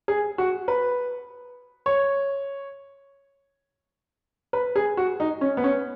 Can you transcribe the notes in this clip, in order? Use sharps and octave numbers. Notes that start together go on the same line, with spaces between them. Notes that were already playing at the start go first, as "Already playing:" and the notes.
G#4
F#4
B4
C#5
B4
G#4
F#4
D#4
C#4
B3
C#4